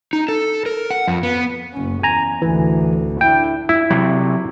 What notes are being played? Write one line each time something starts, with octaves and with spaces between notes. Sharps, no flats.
D#4
A4
A#4
F#5
F2
B3
F#1 C#4
E2 G#5 A#5
A1 D2 E3
D4 E4 G5
E4
C3 F#3